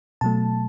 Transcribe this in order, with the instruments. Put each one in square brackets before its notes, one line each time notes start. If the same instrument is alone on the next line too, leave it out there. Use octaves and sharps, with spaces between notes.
[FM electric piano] B2 F#3 A3 A5